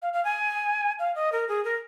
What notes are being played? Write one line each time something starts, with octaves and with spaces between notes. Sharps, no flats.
F5
F5
G#5
F5
D#5
A#4
G#4
A#4